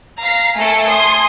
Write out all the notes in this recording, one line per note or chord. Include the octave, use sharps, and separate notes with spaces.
F5 A#5 B6 C7
A3 A4 G#5
G#5 C6 D#6